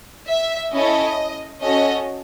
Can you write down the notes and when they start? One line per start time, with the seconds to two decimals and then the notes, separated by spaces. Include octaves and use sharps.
0.28 E5
0.72 C#4 E4 A4 D#5
1.60 C#4 F#4 A4 D#5